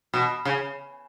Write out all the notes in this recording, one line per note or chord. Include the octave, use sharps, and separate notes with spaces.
B2
C#3